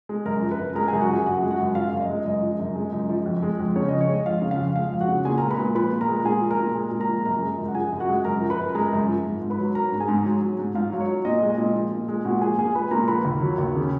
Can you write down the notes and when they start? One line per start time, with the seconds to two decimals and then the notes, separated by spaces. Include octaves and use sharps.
0.09 G#3
0.25 F#2 A#4 A#5
0.42 F3
0.51 B4 B5
0.59 F#2
0.75 G#3 A#4 A#5
0.88 G#4 G#5
0.93 F#2
1.01 F#4 F#5
1.10 F3 G#4 G#5
1.26 F#2 F#4 F#5
1.42 G#3
1.51 F#4 F#5
1.60 F#2
1.75 F3 F4 F5
1.92 F#2
2.00 D#5
2.10 G#3
2.25 F#2 D#5
2.42 F3
2.60 F#2
2.76 G#3
2.92 F#2
3.09 F3
3.26 F2
3.43 G#3
3.59 F2
3.76 C#3 C#5
3.89 F2 D#5
4.01 C#5
4.09 G#3 D#5
4.26 F2 F4 F5
4.42 C#3
4.50 F4 F5
4.59 F2
4.75 G#3 F4 F5
4.92 F2
5.01 F#4 F#5
5.08 C#3
5.25 A#2 G#4 G#5
5.38 A#4 A#5
5.42 G#3
5.50 B4 B5
5.58 A#2
5.75 F3 B4 B5
5.93 A#2
6.01 A#4 A#5
6.08 G#3
6.25 A#2 G#4 G#5
6.42 F3
6.51 A#4 A#5
6.59 A#2
6.75 G#3
6.91 A#2
7.00 A#4 A#5
7.09 F3
7.25 F#2 A#4 A#5
7.42 G#3
7.58 F#2
7.68 F#5
7.75 F3 G#4 G#5
7.93 F#2
8.00 F#4 F#5
8.09 G#3
8.25 F#2 A#4 A#5
8.41 F3
8.50 B4 B5
8.58 F#2
8.75 G#3 A#4 A#5
8.93 F#2
9.09 F3
9.26 G#2
9.41 G#2
9.50 B4 B5
9.58 F#3
9.75 F#3 A#4 A#5
9.92 G#2
10.00 G#4 G#5
10.08 G#2
10.25 F#3
10.42 F#3
10.59 G#2
10.75 G#2 F4 F5
10.92 F#3
11.00 C#5
11.08 F#3
11.25 A#2 D#5
11.42 G#3
11.50 D#5
11.58 A#2
11.75 F3
11.91 A#2
12.09 G#3
12.25 A#2 F#4 F#5
12.41 F3 G#4 G#5
12.58 A#2 G#4 G#5
12.75 G#3 B4 B5
12.91 A#2 A#4 A#5
13.08 F3 B4 B5
13.25 D#2
13.41 F#3
13.58 D#2
13.76 C#3